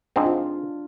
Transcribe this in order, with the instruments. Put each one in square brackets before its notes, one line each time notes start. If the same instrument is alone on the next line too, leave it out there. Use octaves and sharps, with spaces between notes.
[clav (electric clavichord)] G#2 F3 C4 [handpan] D4
[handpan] F4